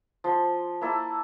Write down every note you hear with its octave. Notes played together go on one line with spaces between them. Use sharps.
F3 C6
A#3 E4 A4